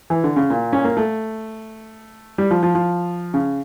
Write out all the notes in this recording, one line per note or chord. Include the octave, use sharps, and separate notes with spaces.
E3
D3
C#3
A#2
C#4
A#3
A3
G3
F3
F3
F3
C#3